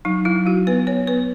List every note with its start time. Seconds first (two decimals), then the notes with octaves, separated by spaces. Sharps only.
0.05 F#3 D#4
0.25 F#3 E4
0.46 F#3 F#4
0.67 B3 B4
0.87 B3 C#5
1.07 B3 B4